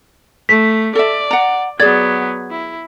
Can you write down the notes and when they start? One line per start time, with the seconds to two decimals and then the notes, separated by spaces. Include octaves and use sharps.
0.49 A3 B6
0.95 A4 D5 E5
1.31 F#5 A#5
1.80 F#3 B3 G#4 D5 G#6
2.51 E4